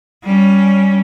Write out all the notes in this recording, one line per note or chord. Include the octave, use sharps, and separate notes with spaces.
G3 C#4